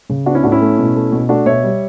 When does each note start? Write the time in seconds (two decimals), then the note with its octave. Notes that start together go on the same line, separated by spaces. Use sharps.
0.09 C#3
0.26 B3 D4 F#4
0.35 C#4 E4
0.43 A2 D4 F#4
0.52 C#4 E4
0.61 A3
0.78 B2
0.96 A3
1.12 B2
1.29 A3 D4 F#4
1.46 B2 C#5 E5
1.63 G3